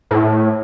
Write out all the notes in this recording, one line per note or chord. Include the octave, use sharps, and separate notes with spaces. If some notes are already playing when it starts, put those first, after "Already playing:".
A2